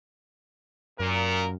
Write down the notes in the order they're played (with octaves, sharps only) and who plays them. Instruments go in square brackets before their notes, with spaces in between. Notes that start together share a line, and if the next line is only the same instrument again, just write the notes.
[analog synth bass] F#2 [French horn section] A#2 [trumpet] A#4